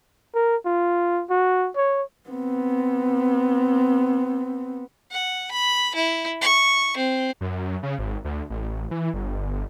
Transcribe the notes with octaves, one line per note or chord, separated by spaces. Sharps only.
A#4
F4
F#4
C#5
B3 C4
F#5
B5
E4
C#6
C4
F#2
C#3
G#1
D2
A1
E3
G1